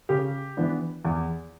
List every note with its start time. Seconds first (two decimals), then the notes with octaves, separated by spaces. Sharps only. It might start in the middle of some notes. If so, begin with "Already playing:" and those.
0.09 C#3 G4
0.57 E3 B3 D4
1.05 E2